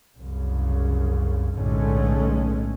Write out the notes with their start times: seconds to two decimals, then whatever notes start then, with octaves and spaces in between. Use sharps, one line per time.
0.19 C2 F#2 C#3
1.56 B1 A2 D3 G#3 A3 C#4